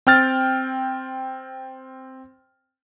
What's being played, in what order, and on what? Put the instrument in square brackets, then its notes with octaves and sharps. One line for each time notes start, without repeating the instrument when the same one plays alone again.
[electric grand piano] C4 G5 F6 A6